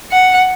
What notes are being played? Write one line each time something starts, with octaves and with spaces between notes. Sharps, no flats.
F#5